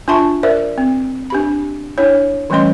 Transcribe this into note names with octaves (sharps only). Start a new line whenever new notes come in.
D4 F4 E5 A5 C6 C#6
A#4 C5 D5 E5
C4
D4 G4 B5
D4 E4 C#5
E3 G3 A3 C#4 D#5 C6